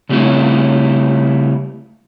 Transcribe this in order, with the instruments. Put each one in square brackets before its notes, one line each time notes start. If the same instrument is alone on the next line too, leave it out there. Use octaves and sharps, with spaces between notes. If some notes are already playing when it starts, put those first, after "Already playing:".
[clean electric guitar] C#3 G3 A3 C4 C#4 E4